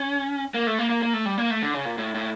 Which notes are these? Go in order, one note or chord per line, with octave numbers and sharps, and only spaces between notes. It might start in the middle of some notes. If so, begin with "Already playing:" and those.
Already playing: C#4
A#3
A3
A#3
A#3
A#3
A3
G3
A#3
A3
D3
C#3
A#2
A2
A2